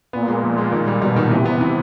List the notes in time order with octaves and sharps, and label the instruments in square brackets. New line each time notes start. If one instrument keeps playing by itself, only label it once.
[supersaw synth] A#2 [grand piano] B3
[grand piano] G#3
F3
G#3
[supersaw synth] A#2 [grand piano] D#3
[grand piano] G3
[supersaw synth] B2 [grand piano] G3
[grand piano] D#3
[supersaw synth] C3 [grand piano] E3
[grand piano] B3
E3